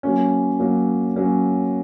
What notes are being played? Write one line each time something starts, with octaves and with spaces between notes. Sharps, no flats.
F#3 A#3 C#4
F#3 A#3 C#4
F#3 A#3 C#4